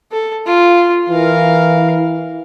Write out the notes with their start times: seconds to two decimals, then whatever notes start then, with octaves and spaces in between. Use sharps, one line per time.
0.12 A4
0.47 F4
1.09 E3 A#4 F5